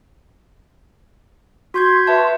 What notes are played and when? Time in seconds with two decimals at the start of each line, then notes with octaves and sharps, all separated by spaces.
1.74 F#4 C6 G6 G#6
2.07 B4 E5 A5